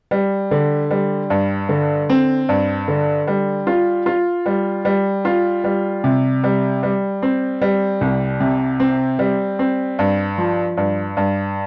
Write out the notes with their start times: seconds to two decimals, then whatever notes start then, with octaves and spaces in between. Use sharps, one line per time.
0.11 G3
0.51 D3
0.91 G3
1.30 G2
1.69 D3
2.10 C4
2.49 G2
2.88 D3
3.27 G3
3.67 F4
4.06 F4
4.46 G3
4.85 G3
5.25 F4
5.64 G3
6.04 C3
6.44 G3
6.83 G3
7.22 C4
7.62 G3
8.01 C2
8.40 C3
8.80 C4
9.19 G3
9.59 C4
9.99 G2
10.38 F3
10.77 G2
11.17 G2